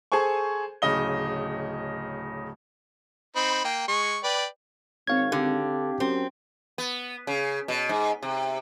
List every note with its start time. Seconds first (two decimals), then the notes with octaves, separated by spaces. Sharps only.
0.12 G#4 A4 C5 G#5 C#6
0.82 D1 C#3 D#5 G7
3.36 C4 D#4 B5
3.64 A#3 G5
3.88 G#3 C#6
4.24 B4 D5 G5
5.07 G#1 C4 C#5 F5 G#6
5.32 D3 G4
6.00 F#2 C4
6.78 B3
7.27 C#3
7.68 B2
7.89 G#2
8.23 C3